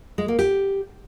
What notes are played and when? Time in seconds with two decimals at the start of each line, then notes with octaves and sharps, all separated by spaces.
0.18 G#3
0.28 A#3
0.39 G4